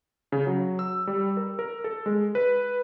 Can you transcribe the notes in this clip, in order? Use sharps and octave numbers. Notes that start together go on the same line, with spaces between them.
C#3
F#3
E6
G3
A#4
A#4
A4
G#3
B4